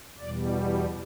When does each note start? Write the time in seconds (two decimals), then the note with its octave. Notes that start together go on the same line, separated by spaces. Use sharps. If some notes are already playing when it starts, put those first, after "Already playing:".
0.19 E2 B2 G3 D5